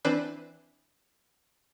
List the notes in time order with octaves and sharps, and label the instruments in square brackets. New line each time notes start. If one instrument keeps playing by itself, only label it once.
[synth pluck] E3 C4 D4 B4 C5 D5